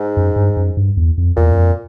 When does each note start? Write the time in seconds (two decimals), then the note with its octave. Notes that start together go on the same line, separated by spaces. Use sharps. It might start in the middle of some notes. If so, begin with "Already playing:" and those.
Already playing: G#2
0.17 F#2
0.36 G2
0.57 F#2
0.77 G2
0.97 E2
1.18 F2
1.37 E2 A#2
1.52 F#2
1.57 F2